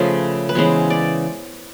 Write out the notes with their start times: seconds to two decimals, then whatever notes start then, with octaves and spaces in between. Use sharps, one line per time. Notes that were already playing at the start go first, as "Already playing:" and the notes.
Already playing: C#3 F3 A3 B4
0.49 B4
0.55 C#3 E3 G#3 B3 C5
0.90 D5